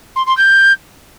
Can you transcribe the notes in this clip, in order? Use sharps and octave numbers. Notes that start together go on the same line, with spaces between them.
C6
C6
G6